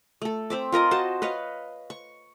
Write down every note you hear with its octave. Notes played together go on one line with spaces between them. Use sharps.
A3 A4
C4 E5 D6
F4 A#4 D#5 A#5
F#4 C5 D#5 A5
B4 C#5 D#5 F5
C#6